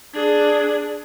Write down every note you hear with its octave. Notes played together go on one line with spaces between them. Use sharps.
D4 G#4